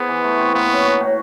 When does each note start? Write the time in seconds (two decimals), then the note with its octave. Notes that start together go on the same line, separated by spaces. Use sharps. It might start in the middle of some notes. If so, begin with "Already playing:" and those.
Already playing: B3 E4 G#4 C5
0.09 E3
0.24 A3
0.39 C4
0.54 A#3 B3
0.69 C#4
0.85 F#4
1.00 A2